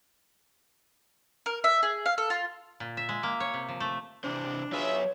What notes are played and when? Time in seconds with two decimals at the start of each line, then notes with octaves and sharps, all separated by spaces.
1.46 A#4
1.64 E5
1.83 G#4
2.06 F5
2.18 A4
2.30 F4
2.80 A#2
2.97 E5
3.09 G#3
3.23 A#3
3.40 C#5
3.54 C3
3.69 F3
3.80 A3
4.24 C3 E3 D4 C5
4.72 F#3 F4 F#4 G#4 B4 C#5 E5